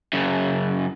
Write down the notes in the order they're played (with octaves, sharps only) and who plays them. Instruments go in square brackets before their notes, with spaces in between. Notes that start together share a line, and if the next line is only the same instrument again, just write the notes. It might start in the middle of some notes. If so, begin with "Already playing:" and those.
[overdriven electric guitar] F#2 C#3